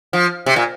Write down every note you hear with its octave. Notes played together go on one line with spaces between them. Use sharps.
F3
C3
A#2